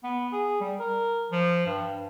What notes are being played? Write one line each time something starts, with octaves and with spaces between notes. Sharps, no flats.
B3
G#4
G3
A#4
F3
G2